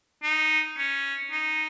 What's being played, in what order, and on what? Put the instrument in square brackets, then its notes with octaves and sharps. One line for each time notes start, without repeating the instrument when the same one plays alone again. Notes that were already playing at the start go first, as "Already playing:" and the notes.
[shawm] D#4
C#4
D#4